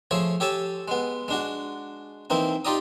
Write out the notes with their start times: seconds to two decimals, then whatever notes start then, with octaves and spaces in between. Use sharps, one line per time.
0.11 F3 A3 G#4 C#5
0.40 G4 A4 C#5 G#5 A5
0.88 G#3 B3
1.28 G#3 D4 F#4
2.30 E3 A#3 C4 D#4
2.65 D#4 F4 G4 D5 A#5 D#6